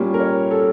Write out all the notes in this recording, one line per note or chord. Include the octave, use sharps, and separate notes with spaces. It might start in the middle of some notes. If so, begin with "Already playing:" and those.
Already playing: A#2 G3 C#4
A#4
C#5
A4